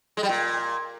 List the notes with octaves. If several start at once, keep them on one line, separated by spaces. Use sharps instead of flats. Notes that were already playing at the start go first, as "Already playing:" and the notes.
G#3
G3
A#2